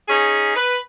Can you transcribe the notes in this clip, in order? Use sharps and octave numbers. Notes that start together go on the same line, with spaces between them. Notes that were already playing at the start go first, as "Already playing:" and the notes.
C#4 D#4 G#4
B4